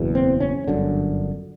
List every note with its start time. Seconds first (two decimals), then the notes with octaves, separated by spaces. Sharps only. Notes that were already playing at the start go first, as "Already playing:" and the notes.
Already playing: F#1 E2 B2
0.15 C4
0.40 C#4
0.68 G1 F#2 D3